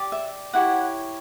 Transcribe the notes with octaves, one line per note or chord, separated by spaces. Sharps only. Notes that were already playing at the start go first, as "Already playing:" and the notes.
Already playing: G4 D5
E5
E4 G4 C#5 F#5